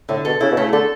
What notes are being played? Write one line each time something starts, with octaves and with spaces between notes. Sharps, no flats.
A2 D3
B2 A4
C#3 E4
B2
C#3 A3
D3 A4